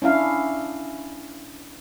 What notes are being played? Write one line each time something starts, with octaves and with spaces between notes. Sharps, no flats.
C#4 D4 E4 F5